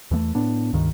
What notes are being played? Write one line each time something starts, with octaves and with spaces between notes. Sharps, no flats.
E2 E3 G#3 A3
A2 B3 D4
C#2 G2 D#3